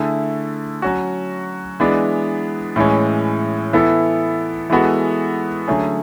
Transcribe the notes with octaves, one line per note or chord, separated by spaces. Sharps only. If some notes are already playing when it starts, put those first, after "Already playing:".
Already playing: D3 A3 E4 G#4
F#3 C#4 F#4
E3 G#3 B3 D4
A2 E3 G#3 C#4
E3 B3 E4 A4
E3 G#3 B3 F#4 A4
D3 F#3 A3 C#4 G#4